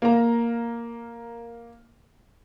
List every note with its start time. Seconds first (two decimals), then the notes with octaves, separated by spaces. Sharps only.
0.02 A#3 A#4 A#5